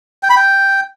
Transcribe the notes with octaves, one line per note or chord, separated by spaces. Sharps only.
G5
B5
G5